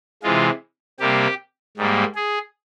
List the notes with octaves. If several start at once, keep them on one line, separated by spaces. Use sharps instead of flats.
C3 E3 G#3 F4
C3 G3 A#3 G4
G#2 G3 A#3
G#4